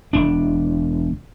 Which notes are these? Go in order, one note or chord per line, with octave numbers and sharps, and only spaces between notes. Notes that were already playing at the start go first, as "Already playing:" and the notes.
E1 D4